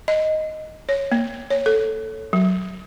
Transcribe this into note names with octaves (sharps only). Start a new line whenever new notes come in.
D#5
C#5
A#3
C#5
A4
F#3